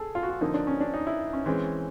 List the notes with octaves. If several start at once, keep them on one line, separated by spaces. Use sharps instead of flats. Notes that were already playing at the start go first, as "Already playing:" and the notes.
Already playing: G#4 A4
F4
F#4
F4
D3 F3 A#3 D#4
D4
C#4
D4
D#4
E4
C#4
E3 G#3 C4 C#4